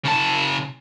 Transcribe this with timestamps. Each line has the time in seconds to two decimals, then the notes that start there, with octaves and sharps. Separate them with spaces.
0.05 C#3 A5